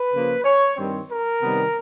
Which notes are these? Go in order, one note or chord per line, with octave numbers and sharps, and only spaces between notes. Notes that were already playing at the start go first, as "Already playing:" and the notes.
Already playing: B4
C#3 F3 A#3
C#5
G2 D#3 G3 C4
A#4
C3 D#3 G3 B3